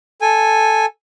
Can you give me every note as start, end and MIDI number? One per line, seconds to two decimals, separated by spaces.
0.22 0.86 69
0.22 0.86 80